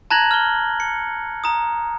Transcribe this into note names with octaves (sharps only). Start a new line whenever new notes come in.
A5 A#5 F#6 G#6 A#6 F#7
F6 G7
C#7
A#5 D#6